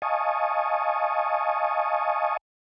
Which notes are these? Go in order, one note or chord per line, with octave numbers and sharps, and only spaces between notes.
D#5 F5 G#5 A5 C#6 D#6